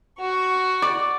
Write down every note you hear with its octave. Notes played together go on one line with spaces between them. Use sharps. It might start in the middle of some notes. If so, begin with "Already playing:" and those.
F#4 C#6
D5